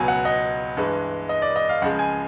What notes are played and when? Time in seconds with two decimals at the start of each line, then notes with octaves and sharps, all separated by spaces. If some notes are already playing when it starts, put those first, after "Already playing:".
Already playing: C#2 B2 F#3 G#5
0.08 F#5
0.25 D#5
0.77 G2 E3 G#3
1.29 D#5
1.42 D5
1.56 D#5
1.69 F5
1.82 C#2 C#3 F3 G#3 F#5
1.99 G#5